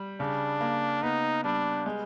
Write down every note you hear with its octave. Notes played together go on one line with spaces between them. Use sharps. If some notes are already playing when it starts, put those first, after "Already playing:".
Already playing: G3
C#3 D4
A#3
B3 D#4
G3 D4
G#3